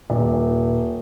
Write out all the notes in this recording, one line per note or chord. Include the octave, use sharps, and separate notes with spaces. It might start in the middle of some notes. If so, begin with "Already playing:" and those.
D#1